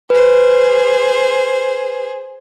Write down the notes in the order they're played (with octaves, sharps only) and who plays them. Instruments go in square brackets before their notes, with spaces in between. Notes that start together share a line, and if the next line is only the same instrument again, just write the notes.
[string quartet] G#4 C5 [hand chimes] B4